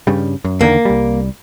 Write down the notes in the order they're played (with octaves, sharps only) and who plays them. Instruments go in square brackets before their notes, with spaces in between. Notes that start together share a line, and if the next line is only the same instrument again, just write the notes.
[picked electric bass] G2 C#3 G3
F#2
[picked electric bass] E2 D3 D#3 [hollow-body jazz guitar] A#3
[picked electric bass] C2 G3